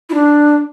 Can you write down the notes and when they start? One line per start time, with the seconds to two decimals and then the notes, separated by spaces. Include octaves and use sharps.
0.10 E4
0.14 D4